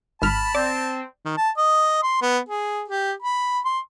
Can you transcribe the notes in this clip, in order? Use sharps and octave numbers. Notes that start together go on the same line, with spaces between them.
G#1 A5 B5 F6
C4 D5
D#3
A5
D#5
C6
B3
G#4
G4
B5
C6